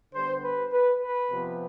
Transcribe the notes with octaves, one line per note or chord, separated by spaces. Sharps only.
D3 G3 B3 C5
B4
B4
B4
C3 F3 B3